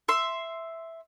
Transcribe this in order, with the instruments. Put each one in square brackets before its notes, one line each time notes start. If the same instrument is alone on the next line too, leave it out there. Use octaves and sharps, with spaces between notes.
[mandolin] E5 C6